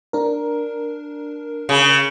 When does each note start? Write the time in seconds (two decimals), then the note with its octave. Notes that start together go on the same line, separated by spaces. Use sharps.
0.13 D4 A#4
1.69 C#3